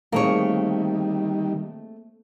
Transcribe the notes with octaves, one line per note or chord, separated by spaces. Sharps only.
D#3 G3 A3 A#3 C4 G#4 C#5